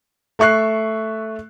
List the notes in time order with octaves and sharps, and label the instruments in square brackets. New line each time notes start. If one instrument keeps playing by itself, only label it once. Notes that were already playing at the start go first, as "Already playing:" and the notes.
[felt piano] A3 E5 C#6 F#6 C7